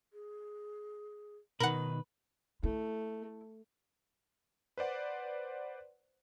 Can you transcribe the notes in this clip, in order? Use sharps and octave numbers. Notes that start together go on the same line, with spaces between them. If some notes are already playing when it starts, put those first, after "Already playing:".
G#4
B2 D#3 D#4 A#4 B4 F#5
A3 E4
B4 C5 D5 F#5